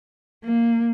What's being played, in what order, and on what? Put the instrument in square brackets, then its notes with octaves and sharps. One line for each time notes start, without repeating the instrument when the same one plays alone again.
[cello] A#3